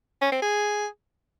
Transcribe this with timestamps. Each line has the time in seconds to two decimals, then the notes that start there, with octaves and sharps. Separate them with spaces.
0.22 C#4
0.32 C4
0.42 G#4